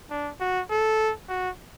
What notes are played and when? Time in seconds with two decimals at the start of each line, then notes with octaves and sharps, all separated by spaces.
0.10 D4
0.40 F#4
0.70 A4
1.29 F#4